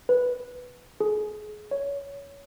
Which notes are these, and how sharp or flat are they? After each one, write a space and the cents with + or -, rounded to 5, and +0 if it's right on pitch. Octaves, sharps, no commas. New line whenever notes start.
B4 +5
G#4 +30
C#5 +15